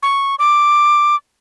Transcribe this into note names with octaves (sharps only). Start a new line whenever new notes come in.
C#6
D6